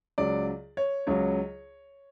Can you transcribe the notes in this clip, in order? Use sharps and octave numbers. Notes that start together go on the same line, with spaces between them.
C#2 C#3 F#3 D5
C#5
C#2 C#3 F#3 C#5